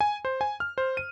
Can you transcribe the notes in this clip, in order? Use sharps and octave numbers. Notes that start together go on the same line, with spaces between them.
G#5
C5
G#5
F6
C5
D#7